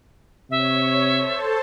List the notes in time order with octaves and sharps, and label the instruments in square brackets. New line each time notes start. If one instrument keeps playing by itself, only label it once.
[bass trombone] C3 [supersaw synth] C#5 [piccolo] E5
[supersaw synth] A4 C5 A5